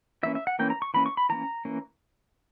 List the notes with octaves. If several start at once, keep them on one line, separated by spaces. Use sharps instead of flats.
E3 A#3 C#4 E5
E5
F#5
E3 A#3 C#4 G5
A#5
C#6
E3 A#3 C#4 B5
C#6
B5
E3 A#3 C#4 A#5
E3 A#3 C#4